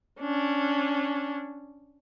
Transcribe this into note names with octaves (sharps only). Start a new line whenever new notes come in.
C#4 D4